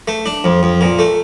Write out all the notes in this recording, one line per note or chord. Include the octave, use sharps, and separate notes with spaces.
A3
D4
F2
F2
A#2
A3